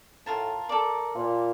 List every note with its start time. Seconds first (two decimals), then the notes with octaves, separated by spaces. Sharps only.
0.26 A2 F4 A#4 A5
0.69 A4 A#4 D5
1.15 A#2 F4